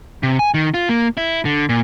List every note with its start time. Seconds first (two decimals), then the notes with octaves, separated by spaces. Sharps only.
0.23 C3
0.39 G#5
0.54 D#3
0.74 F4
0.89 A#3
1.17 E4
1.45 D3
1.69 A#2